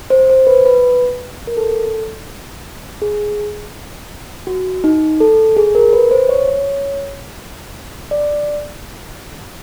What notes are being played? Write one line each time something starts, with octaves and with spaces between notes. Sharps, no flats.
C5
C5
B4
B4
A#4
A4
G#4
F#4
D#4
A4
G#4
A#4
B4
C5
C#5
C#5
D5